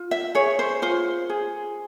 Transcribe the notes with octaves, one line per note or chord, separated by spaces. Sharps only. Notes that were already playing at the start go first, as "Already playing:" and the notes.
Already playing: F4
E5
G#4 C#5
C5
F4 C5
G#4